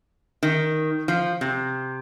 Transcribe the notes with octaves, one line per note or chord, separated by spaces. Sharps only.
D#3
F3
C3